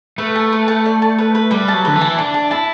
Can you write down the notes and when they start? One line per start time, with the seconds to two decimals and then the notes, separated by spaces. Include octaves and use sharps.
0.18 A3 B4
0.36 A5
0.52 B4
0.68 A5
0.86 D5
1.02 A5
1.18 B4
1.35 B4
1.51 G3 B4
1.68 A5
1.73 F#3
1.85 D3 B4
1.96 E3
2.01 A5
2.09 E4
2.17 D4 A5
2.34 A5
2.51 E4 A5